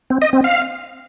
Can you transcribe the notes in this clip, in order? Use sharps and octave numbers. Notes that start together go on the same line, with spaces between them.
C4
D#5
C4
F5